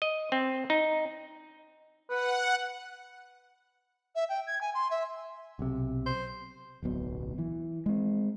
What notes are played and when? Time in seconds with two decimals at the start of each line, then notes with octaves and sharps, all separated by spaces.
0.02 D#5
0.32 C4
0.70 D#4
2.10 B4 F#5
4.15 E5
4.29 G5
4.47 G#6
4.61 G#5
4.74 C6
4.90 E5
5.59 B1 C3
6.06 C5
6.83 D1 B1 B2
7.38 E3
7.86 G#3 C4